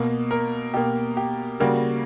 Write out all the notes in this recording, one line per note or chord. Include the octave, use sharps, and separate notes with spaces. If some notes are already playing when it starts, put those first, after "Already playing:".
Already playing: B2 A#3
A#4
B2 A#3 G4
G4
C#3 G3 A#3 F#4